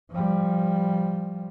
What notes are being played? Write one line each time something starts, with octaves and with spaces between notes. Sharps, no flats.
F3 G3